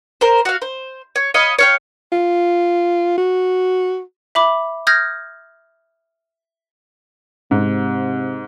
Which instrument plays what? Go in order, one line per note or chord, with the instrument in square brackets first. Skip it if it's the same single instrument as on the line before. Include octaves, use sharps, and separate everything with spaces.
[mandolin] A#4 C5
F#4 F5
C5
C#5
C#5 D#5 F5 B5
C#5 F5 G5
[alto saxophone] F4
F#4
[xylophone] E5 B5 D6
D#6 F6 G6 G#6 A#6
[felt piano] G#2 [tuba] C3